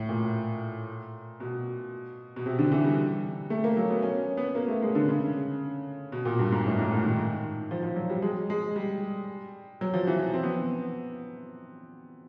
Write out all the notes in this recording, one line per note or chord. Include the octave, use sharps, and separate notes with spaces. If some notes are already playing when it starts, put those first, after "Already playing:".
Already playing: A2
A#2
B2
B2
C3
D3
E3
G3
A3
A#3
F#3
B3
C#4
B3
A#3
A3
G#3
D3
C#3
B2
A#2
G2
G#2
A2
A2
A#2
D#3
F3
F3
F#3
G3
G#3
G#3
G3
F#3
F3
E3
F3
C4
B3